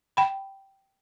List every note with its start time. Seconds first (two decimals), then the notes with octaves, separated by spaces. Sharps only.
0.17 G5 B5